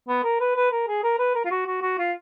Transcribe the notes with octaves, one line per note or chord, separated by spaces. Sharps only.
B3
A#4
B4
B4
A#4
G#4
A#4
B4
A#4
F4
F#4
F#4
F#4
F4